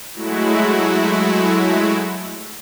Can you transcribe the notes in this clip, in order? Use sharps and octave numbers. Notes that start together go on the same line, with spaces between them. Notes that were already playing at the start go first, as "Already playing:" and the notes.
F#3 G#3 A3 E4 F#4